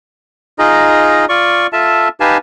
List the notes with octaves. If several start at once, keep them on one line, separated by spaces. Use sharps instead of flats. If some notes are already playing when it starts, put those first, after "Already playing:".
D#4 F4 G#4 D#5 A#5
F4 D5 C#6
F4 A4 E5 A5
D#4 G4 B4 F5 G#5 A5